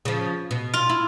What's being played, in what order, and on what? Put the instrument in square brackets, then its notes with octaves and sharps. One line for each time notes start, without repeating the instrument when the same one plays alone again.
[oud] C#3 F3
B2
[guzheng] F4
[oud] E4